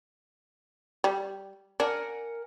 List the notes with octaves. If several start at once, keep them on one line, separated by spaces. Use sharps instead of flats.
G3
D4 A#4 F#5 G#5